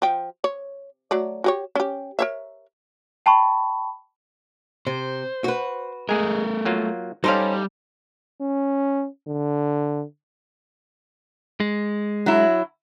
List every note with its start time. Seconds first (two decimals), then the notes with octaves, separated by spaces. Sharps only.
0.02 F3 G5
0.44 C#5
1.11 F#3 A3 D5
1.44 F#4 G4 C#5
1.75 C#4 G4
2.19 A#4 C#5 E5
3.26 G5 A5 B5 C#6
4.87 C3 C5
5.44 F#4 B4
6.09 G#3 A3 G#4 A#4
6.65 F#3 A#3 F4
7.24 G3 C#4 D#4 G4 A4 C5 F5
8.41 C#4
9.27 D3
11.60 G#3
12.26 F#3 E4